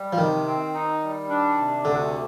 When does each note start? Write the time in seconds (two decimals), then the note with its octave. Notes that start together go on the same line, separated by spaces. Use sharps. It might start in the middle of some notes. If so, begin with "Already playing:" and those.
Already playing: G3
0.13 F3
0.18 C3 D#3
0.46 C4
0.74 D#4
1.02 G3
1.29 D4
1.57 C3
1.85 D2 D3